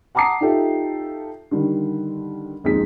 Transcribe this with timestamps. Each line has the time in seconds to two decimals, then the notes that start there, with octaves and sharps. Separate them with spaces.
0.15 F#5 A5 A#5 D6 D#6 C7
0.41 D#4 F4 G4 A4 E5
1.51 D3 D#3 G3
2.64 D#1 F2 G#3 D#4 G#4 B6